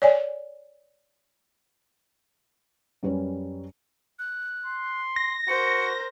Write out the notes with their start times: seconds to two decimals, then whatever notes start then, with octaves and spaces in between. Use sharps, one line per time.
0.02 C#5 D5 G#5
3.03 F#2 G3 C#4 B4 C#5
4.19 F#6
4.66 C6
5.16 A#6
5.48 F#4 A#4 C5 C#7